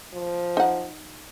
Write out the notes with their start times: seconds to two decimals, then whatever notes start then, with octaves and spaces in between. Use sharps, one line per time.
0.13 F3
0.57 D#4 F#5